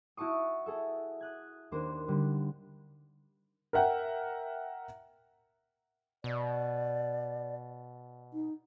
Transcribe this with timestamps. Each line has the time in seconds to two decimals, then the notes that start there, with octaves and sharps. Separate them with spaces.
0.17 E4 F#4 A5 C#6 D#6
0.66 G#4 A4 E5
1.20 D#6 F#6 G#6
1.71 D#2 A#3 D4 C5
2.08 D3 G3
3.73 A#4 E5 F#5 G5
6.24 B2 D5
8.34 D#4